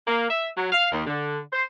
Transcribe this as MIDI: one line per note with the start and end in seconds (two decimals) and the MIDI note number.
0.08 0.29 58
0.30 0.48 76
0.57 0.67 54
0.72 0.91 77
0.92 1.04 39
1.06 1.39 50
1.53 1.64 72